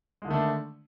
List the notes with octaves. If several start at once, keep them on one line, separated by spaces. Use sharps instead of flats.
D3 D#3 G#3 A3 D4